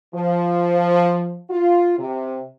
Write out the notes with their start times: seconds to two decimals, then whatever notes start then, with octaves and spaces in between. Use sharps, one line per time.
0.15 F3
1.50 F4
1.99 C3